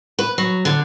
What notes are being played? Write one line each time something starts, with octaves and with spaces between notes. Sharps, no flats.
B4
F#3
D3